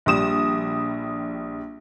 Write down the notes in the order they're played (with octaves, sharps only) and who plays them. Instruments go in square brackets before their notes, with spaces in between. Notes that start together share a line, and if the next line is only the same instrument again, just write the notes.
[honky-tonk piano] A#1 G3 D#6 E7